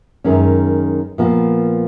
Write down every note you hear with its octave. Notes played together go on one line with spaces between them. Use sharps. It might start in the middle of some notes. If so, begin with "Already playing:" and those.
F#2 D#3 G#3 C#4
A#2 F3 B3